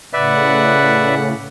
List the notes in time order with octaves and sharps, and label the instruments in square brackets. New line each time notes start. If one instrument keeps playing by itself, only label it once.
[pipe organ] A2 C#3 [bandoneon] B4 D5 E5 [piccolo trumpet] F#5